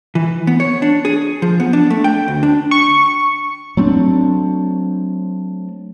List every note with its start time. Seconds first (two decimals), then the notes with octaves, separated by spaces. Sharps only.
0.15 E3
0.47 B3
0.60 C#5
0.82 D4
1.05 G#4
1.42 F3
1.60 B3
1.73 D4
1.90 A3
2.04 G5
2.28 D2
2.43 D4
2.71 C#6
3.77 F#3 A3 C4 D4